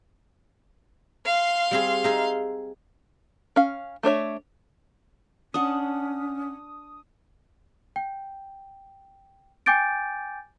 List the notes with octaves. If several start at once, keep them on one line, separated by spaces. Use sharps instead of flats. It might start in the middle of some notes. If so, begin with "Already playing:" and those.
F5 C6
G3 C4 G#4
D#4 G#4 E5
C#4 F5
A3 D4 C#5 E5
C#4 D4 F#5 D#6
G5
G5 G#5 D6 G6 A6 D7